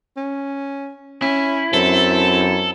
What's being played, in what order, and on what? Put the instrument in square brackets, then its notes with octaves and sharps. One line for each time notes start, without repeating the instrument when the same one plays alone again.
[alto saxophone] C#4
[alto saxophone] C#4 [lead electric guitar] E4
[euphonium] F#2 [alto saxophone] C4 [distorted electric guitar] A4